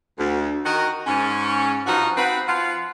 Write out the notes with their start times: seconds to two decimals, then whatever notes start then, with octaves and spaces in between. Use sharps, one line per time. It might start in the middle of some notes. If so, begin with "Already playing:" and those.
0.18 D2
0.64 D#3 F#4 A#4 D#5
1.07 G#2 C#4
1.87 G2 F3 D#4 F#4
2.16 C4 D#4 F#4 B4
2.47 F3 F4 F5 F#5